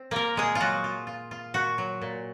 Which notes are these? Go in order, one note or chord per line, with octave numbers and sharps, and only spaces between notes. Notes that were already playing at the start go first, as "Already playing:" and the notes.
Already playing: C4
A#3 F4 A#4
A#2 G#3 G#4
F4
F#3 F#4
F4
F4
F4
A#2 F#4
F#3
A#2